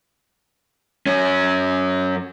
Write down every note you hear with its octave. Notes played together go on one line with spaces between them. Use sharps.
F#2 C#4